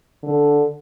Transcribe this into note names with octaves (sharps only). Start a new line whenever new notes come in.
D3